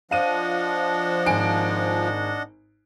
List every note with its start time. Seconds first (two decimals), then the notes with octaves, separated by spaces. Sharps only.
0.11 F3 D4 D#5 F5 F#5 D#7
1.26 G#1 G#5 D7